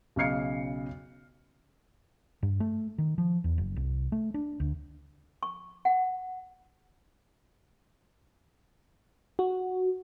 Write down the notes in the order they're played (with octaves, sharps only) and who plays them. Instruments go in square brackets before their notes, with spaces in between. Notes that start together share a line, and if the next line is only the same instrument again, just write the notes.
[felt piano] B1 C#3 D#5 F6 C7 C#7
[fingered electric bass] G2
A3
D#3
F3
E2
F#1
C2
A3
D4
D2
[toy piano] C#6
F#5
[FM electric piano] F#4